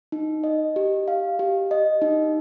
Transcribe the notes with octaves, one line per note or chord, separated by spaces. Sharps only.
D#4
D#5
G4
F5
G4
D#5
D#4